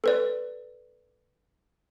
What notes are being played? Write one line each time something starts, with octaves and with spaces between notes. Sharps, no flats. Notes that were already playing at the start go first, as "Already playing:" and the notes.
A4 B4 D5